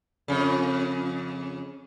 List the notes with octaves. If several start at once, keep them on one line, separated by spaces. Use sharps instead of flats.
F2 C#3